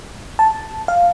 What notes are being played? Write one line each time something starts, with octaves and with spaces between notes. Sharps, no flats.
A5
F5